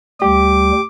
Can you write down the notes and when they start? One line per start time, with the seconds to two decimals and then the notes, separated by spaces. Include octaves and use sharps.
0.22 D2 G3 G4 D6